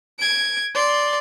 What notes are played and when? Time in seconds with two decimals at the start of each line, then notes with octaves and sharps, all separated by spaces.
0.19 G#6 D7
0.74 D5 C6